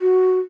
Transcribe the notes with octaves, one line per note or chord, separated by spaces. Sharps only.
F#4